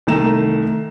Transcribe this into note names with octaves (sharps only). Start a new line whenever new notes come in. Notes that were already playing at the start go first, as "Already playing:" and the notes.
C2 D#3 A3 A#5 E7